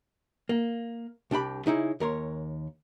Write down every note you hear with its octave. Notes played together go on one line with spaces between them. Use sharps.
A#3
C2 D4 G4 B5
C#3 D#4 E4 G#4
D#2 A#4 C#5 C6